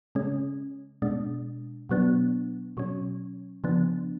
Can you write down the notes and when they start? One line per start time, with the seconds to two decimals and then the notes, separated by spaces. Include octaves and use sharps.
0.15 C#3 G#3 C#4
1.02 B2 G#3 D4
1.89 B2 F#3 B3 D4
2.77 B2 F#3 C#4
3.64 C#3 F3 B3 D4